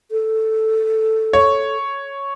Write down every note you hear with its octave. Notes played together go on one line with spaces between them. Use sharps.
A4
C#5